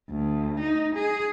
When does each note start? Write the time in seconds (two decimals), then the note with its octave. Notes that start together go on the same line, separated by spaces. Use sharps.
0.10 D2
0.59 D#4
0.94 G#4